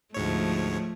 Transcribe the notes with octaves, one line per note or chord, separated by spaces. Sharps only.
D2 G#2 F3 A3 C#5